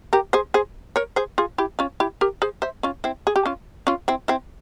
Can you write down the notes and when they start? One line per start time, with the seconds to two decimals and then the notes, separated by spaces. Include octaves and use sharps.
0.13 G4 A#4
0.33 G#4 C5
0.54 G#4 C5
0.96 A#4 C#5
1.16 G#4 C5
1.38 F4 G#4
1.58 E4 G4
1.79 C#4 F4
2.00 E4 G4
2.21 G4 A#4
2.42 G#4 C5
2.62 C5 E5
2.83 C#4 F4
3.04 C4 E4
3.27 G#4
3.36 G4
3.46 C#4 F4
3.87 C#4 F4
4.08 C4 E4
4.28 C4 E4